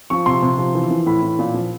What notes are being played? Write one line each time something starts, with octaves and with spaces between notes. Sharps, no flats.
F3 C#6
C3 C6
C3
F3
E3
E3
A2 B5
E3
A#2
F3